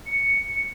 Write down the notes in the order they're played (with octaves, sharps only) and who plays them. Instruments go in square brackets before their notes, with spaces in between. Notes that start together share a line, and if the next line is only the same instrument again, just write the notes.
[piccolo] C#7